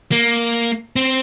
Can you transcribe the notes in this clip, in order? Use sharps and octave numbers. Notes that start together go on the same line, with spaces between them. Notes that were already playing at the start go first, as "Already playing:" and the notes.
A#3
C4